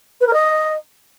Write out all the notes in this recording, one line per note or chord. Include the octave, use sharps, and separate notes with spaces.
B4
A#4
D#5